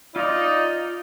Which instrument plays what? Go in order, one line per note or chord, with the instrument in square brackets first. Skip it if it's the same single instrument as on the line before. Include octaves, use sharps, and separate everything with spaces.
[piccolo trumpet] D#4 [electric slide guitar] F4 F5 [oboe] D5